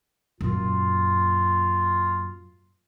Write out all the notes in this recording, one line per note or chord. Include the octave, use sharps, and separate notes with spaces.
F#2 A#2 F4